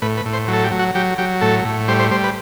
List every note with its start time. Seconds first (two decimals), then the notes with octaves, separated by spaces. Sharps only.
0.02 A2 B4
0.17 B4
0.25 A2
0.33 C5
0.48 F#3
0.53 A4
0.64 G4
0.72 F#3
0.79 F#4
0.95 F#3 G4
1.18 F#3 G4
1.41 A2 A4
1.65 A2
1.88 G3 C5
1.99 C5
2.11 G3 C5
2.24 B4